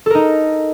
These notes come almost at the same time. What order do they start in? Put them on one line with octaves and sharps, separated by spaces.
A4 A#4 D#4